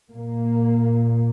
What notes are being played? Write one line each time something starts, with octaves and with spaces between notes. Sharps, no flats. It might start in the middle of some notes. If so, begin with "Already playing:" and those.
A#2 A#3